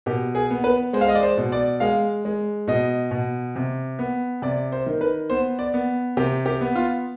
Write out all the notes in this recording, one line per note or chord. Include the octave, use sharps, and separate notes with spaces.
B2 G4
G#4
B3
B4
G#3 C5
F5
D#5
D5
C5
B2
D5
G#3 F5
G#3
B2 D#5
B2
C3
B3
C3 D5
C5
D#3
B4
B3 C5
D5
B3
C3 G4
G4
B3
F4